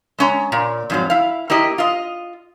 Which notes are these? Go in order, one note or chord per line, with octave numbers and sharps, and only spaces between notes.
G#3 C#4 A#5
A#2
F2 G#2 F#3
E4 F5
A#3 E4 G4 D#5
F4 D#5